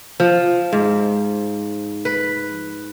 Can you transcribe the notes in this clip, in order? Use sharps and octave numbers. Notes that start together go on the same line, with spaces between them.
F3
G#2
B4